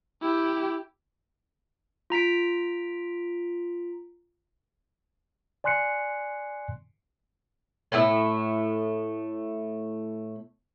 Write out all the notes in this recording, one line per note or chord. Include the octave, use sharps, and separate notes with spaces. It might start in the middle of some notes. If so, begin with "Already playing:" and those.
E4 G4
F4 A#5 B6 D7
D5 G#5 C6 F#6 C7 C#7
A2 A3 E4 E5